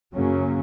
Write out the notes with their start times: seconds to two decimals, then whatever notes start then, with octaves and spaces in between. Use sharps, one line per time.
0.15 F#2 C#3 F#3 A#3 C#4